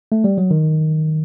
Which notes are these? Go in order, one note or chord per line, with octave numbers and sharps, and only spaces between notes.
A3
G3
F#3
D#3